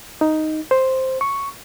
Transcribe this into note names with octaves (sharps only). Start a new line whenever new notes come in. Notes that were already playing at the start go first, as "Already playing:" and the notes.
D#4
C5
C#6